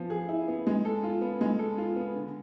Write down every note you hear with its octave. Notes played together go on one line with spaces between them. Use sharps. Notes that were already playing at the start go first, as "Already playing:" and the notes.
Already playing: F3 B3
G#4
E4
B3
G#3
A4
F4
B3
G#3
A4
F4
B3
D3